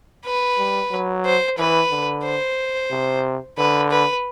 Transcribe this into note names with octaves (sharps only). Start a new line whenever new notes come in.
B4
G3
F#3
C5
E3 B4
D3
C5
C3
D3 B4
B4